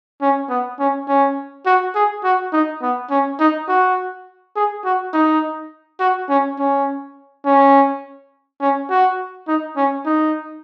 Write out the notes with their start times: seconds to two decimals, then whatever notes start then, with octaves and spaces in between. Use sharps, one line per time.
0.22 C#4
0.50 B3
0.79 C#4
1.08 C#4
1.66 F#4
1.95 G#4
2.24 F#4
2.53 D#4
2.82 B3
3.11 C#4
3.40 D#4
3.69 F#4
4.56 G#4
4.85 F#4
5.14 D#4
6.00 F#4
6.29 C#4
6.59 C#4
7.46 C#4
8.61 C#4
8.90 F#4
9.48 D#4
9.77 C#4
10.06 D#4